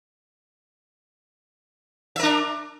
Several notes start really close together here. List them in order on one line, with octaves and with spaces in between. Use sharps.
E5 A#4 D4